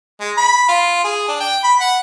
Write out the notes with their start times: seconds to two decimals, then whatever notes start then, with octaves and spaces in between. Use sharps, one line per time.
0.20 G#3
0.37 B5
0.68 F4
1.04 G#4
1.29 D4
1.40 G5
1.64 B5
1.80 F#5